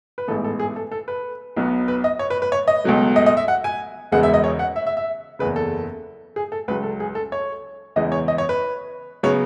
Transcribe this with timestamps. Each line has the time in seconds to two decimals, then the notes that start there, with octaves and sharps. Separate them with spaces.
0.18 B4
0.28 A1 G#2 E3 B3 A4
0.44 A4
0.60 G#4
0.76 A4
0.91 A4
1.08 B4
1.57 B1 B2 F#3 B3
1.88 B4
2.04 D#5
2.19 C#5
2.30 B4
2.42 B4
2.52 C#5
2.68 D#5
2.84 C#2 B2 F#3 A3
3.16 D#5
3.26 D#5
3.37 E5
3.48 F#5
3.64 G#5
4.12 E1 E2 C#3 G#3 B3 F#5
4.23 E5
4.34 D#5
4.44 C#5
4.59 F#5
4.76 E5
4.86 E5
4.97 E5
5.39 F#1 E2 C#3 B4
5.56 A4
6.36 G#4
6.52 A4
6.68 C#2 C#3 F#3 B4
6.83 A4
7.00 G#4
7.15 A4
7.32 C#5
7.96 E2 C#3 E3 G#3 D#5
8.12 C#5
8.28 D#5
8.38 C#5
8.49 B4
9.23 C#3 F#3 B3 C#5